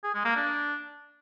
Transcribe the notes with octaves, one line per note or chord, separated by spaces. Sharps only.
G#4
G#3
A#3
D4